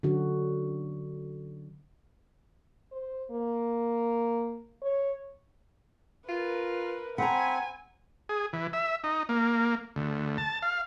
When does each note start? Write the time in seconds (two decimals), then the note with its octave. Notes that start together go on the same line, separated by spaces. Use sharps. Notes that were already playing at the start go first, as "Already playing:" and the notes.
0.03 D3 F#3 C#4 F#4 A4
2.92 C5
3.31 A#3
4.82 C#5
6.29 F4 A#4 B4
7.18 C4 F#5 G#5 A#5 B5
8.29 G#4
8.53 E3
8.73 E5
9.04 D#4
9.29 A#3
9.96 D2
10.38 A5
10.62 F5